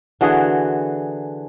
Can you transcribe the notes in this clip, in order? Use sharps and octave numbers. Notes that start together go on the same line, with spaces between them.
D3 E3 F#4 G#4